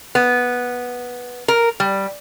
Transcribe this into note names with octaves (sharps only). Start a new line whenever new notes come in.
B3
A#4
G3